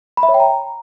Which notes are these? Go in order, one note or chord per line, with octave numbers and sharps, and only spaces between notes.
B5
E5
C#5
G5
A#5